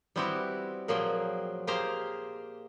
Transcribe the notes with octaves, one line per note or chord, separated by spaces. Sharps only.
G3 B3 C4 E4 F#4 G4
A#2 F3 F#3 A#3 G#4 G5
A#3 G4 G#4 C5 F5 A#5